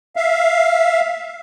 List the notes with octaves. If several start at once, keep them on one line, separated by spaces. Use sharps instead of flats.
E5 F5